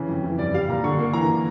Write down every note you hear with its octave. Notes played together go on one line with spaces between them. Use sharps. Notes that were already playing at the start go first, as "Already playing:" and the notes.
Already playing: C#3 E3
F2
E3
G2 D5
G3 F5
A#2 A#5
D3 C#6
A#3
E3 A#5